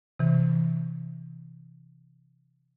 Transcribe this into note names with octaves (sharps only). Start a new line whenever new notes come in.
C3 E3